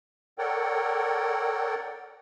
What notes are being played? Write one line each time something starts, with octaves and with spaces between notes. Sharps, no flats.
A4 A#4 C#5 D5 F#5 G5